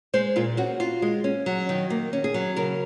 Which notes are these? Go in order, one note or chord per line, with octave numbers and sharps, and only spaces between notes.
G#3 C5
A#2 F4
C#4 F#4
F4
G#3
C#4
F#3
D#3
A#3
C#4
G#4
F#3
C#3 A#4